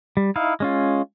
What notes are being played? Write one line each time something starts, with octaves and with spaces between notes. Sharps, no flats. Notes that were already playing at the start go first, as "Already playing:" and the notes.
G3
D#4 E4 F5
G#3 C#4 F4